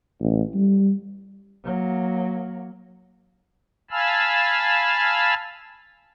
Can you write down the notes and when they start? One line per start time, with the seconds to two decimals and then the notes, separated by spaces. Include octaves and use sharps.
0.20 A1
0.55 G3
1.64 F#3 A#3
3.91 F5 G#5 A5 B5 E6 F6